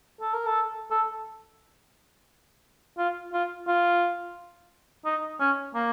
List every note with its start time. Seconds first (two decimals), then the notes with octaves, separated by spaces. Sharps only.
0.21 A4
0.34 A#4
0.47 A4
0.91 A4
2.98 F4
3.33 F4
3.67 F4
5.05 D#4
5.40 C#4
5.75 A#3